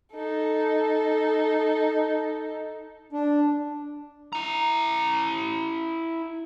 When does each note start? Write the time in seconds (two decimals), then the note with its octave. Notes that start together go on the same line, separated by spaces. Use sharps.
0.13 D#4 A4
3.12 D4
4.33 E4 A#5